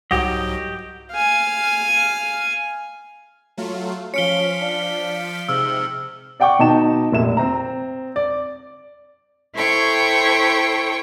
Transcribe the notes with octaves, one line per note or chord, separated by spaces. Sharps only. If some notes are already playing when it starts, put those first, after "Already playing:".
C2 G#2 F#3 F#4 G4 D#5
F5 G#5
F#3 A3 F4
F3 C#4 F5 B6 C#7 D7 G7
D4
G#2 C3 E6 F6
D5 F#5 G5 C#6 D6
B2 D#4 A5 E7
F1 A#2 E5 E7
C4 A#5
D5
E4 A4 C5 C#5 G5 C#6